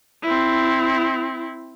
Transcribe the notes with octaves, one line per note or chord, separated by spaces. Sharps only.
C4 E4